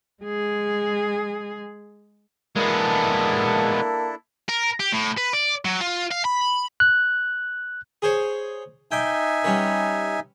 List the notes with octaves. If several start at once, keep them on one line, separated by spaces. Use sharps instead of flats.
G#3 G#4
G#3 A#3 B3 D4 E4 A4
A#4
G4
A2
B4
D5
F#3
F4
F5
B5
F#6
G#4 C5 C#5
D#4 E5 G5 G#5 D6
G3 C#4 B4